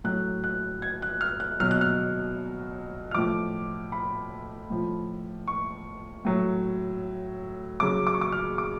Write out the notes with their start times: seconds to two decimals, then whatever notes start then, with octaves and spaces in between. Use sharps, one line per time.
0.04 A2 F#3 F#6
0.44 F#6
0.82 G#6
1.02 F#6
1.21 F6
1.40 F#6
1.60 B2 F#3 F6
1.71 F#6
1.81 F6
3.11 F6
3.15 A2 F3 D6
3.92 B5
4.70 A2 F3
5.48 C#6
6.25 A2 F#3
7.80 C#3 F#3 D6
8.07 D6
8.14 C#6
8.21 D6
8.32 F6
8.58 D6